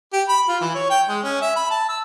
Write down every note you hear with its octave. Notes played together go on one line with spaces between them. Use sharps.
G4
B5
F4
E3
C#5
G5
G#3
C#4
E5
B5
A5
E6